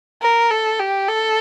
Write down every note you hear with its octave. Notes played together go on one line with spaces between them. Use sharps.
A#4
A4
G4
A4